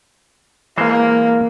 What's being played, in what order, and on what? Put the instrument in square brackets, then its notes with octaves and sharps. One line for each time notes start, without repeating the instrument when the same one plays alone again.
[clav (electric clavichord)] E3 G#3 C5 [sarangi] A#3